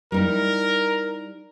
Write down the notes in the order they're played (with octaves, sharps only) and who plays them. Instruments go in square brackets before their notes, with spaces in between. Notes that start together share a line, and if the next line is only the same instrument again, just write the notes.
[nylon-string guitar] G3 D#4 E4 [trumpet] A#4